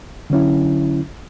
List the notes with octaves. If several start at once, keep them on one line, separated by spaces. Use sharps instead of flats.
D3 F#3 C#4 E4